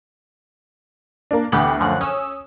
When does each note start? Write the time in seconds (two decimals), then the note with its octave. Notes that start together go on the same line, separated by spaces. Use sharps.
1.31 A#3 D4
1.52 D2 E3 B3 G4 F#5 F#7
1.80 F#2 F3 F#6
2.01 C#4 D#6 E6